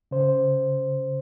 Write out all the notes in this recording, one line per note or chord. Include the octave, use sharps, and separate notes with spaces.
C#3 C5